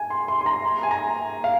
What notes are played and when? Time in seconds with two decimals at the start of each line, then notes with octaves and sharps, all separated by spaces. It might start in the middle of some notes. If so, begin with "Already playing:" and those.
Already playing: G#5
0.10 C6
0.28 C6
0.41 C6
0.46 A#5
0.64 C6
0.83 G#5
0.91 A#5
1.44 F5